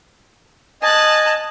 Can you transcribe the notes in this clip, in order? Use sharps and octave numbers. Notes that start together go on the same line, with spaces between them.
D#5 G#5 A5 F#6